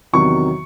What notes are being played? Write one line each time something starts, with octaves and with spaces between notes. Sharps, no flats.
E2 C3 D#3 F#3 C#6